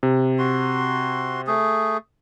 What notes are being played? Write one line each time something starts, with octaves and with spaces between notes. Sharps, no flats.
C3
F#4 C6
A3 G#4